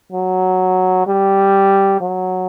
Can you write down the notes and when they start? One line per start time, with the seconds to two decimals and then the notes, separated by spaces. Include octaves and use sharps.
0.12 F#3
1.07 G3
2.01 F#3